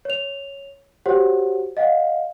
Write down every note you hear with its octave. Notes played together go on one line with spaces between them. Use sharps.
C#5 F7
F#4 G4 C5 C#5 F#5
D#5 F5 F#5